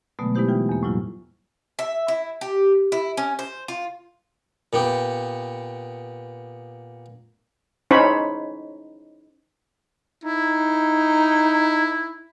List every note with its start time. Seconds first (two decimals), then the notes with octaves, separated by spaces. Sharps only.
0.19 B2 D3 F#3 G#3 A3 B3
0.35 G#3 B3 D#4 E4 G4 C5
0.48 E3 F4 G5
0.69 E2 A#3
0.83 A2 F#3 G3 E4 F4
1.79 E5
2.08 E4
2.41 G4
2.92 E4
3.17 C#4
3.39 C5
3.68 F4
4.73 A#2 B3 G4
7.91 C#4 D#4 E4 C5 C#5 B5
10.24 D#4 E4